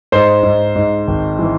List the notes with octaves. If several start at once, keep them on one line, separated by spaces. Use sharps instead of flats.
G#2 C5
G#2
G#2
G#1
E3